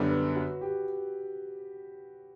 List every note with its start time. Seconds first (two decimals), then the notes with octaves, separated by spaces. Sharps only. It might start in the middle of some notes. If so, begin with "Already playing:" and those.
Already playing: F#2 D3 G3 B3 D4
0.11 B4
0.36 F#4
0.61 G4